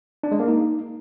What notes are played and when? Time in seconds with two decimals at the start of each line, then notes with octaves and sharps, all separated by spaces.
0.23 D4
0.32 G#3
0.40 A#3
0.48 D#4